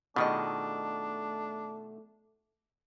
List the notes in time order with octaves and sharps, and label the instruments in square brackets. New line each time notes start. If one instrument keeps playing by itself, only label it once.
[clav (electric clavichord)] B2 D#3 [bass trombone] A3 [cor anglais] D4 [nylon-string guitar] F4 G#4 D#5